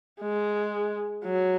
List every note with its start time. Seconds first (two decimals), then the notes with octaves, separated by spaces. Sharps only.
0.21 G#3
1.25 F#3